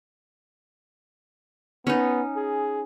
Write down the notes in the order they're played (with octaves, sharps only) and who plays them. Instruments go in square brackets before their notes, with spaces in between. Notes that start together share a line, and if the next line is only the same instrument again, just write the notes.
[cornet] B3 [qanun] C#4 D#4
[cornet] G#4